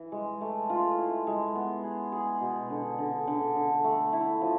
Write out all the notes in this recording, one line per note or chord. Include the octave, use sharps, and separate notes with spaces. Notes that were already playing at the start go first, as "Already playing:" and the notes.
Already playing: E3
G#3
A3
F4
E4
G#3
B3
G#4
G#4
B2
D3
D3
D3
D3
A3
E4
F3